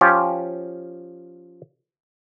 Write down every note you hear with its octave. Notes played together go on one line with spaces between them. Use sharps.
F3 C#4 F4 G4